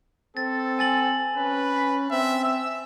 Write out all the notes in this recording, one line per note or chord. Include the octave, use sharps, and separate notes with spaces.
C4 A4 A6
G#5 A6 F#7
C#4 B4
B6
C4 E5
E6